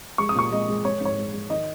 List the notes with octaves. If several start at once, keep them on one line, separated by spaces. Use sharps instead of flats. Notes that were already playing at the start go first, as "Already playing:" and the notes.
G#3 C#6
D#6
A#2 C#6
G#3 D#5
G#3
G#3 C#5
G#2 C#5
G#3
G#3
D#3 D#5